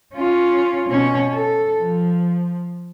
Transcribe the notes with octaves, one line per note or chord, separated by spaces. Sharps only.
C#4 F4
B2 C#4
A4
F3